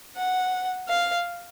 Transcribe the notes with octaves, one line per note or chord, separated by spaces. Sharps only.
F#5
F5